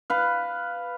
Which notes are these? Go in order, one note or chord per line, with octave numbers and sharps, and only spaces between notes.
B4 F5